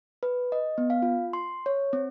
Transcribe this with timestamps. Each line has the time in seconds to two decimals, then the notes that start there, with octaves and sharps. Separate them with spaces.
0.23 B4
0.52 D#5
0.78 B3
0.90 F5
1.02 F4
1.33 C6
1.66 C#5
1.93 C4